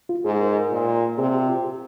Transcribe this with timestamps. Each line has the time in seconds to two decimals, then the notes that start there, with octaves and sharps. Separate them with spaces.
0.09 F4
0.24 G#2 G#4
0.41 A#4
0.56 A#4
0.72 A#2
1.18 C3 G#4
1.33 G4
1.48 F4
1.64 G4